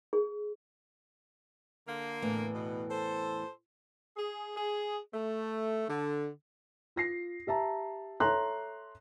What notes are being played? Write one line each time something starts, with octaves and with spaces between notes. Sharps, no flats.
G#4
D3 A#3
E2 A2 E3
B2
A4 C5
G#4
G#4
A3
D3
F4 A#6 C7
G4 E5 A5 A#5
A4 C#5 E5 A#5 C6 F#6